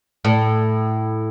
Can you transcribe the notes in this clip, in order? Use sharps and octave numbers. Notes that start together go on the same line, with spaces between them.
A2